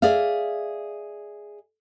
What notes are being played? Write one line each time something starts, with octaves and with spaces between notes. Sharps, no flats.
G#4 D5 E5 F5